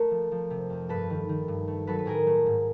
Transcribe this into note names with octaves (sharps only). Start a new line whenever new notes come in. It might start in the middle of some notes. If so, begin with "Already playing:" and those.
Already playing: A3 A#4
F3
F3
C3
F2
G2 A4 B4
D#3
D#3
G2
A3
F#3 A4 B4
B4
A2 G#4 A#4
A3
G#2